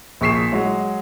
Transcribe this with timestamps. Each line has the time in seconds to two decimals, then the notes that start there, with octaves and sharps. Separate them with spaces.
0.21 A#1 G#4 C#6 B6 C7 E7
0.52 F#3 G#3 G#4